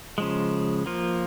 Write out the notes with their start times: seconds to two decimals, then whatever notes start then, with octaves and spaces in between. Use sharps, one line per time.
0.18 C#3 F3 G#3
0.86 F3 A#3 F4